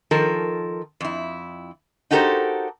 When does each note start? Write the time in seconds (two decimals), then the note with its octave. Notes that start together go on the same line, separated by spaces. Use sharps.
0.11 D#3 F3 A4 A#4
1.01 F2 E4
2.11 D#4 F#4 G4 A4 A#4 C5